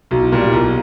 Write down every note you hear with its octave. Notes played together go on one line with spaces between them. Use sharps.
B1 F#4
E4
A#2 G3 E4
G4
F#4
B1 F4